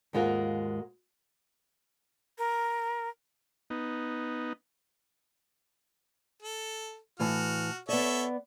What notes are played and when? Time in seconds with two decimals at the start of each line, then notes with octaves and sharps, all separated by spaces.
0.13 D#2 G#2 G#3 F4 F#4 A#4
2.38 A#4
3.70 B3 D#4
6.43 A4
7.20 A2 E3 F#4 A5 F6
7.89 B3 A4 C#5 D5 E5